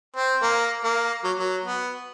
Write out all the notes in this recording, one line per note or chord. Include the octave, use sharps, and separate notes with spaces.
C4
A#3
A#3
F#3
F#3
B3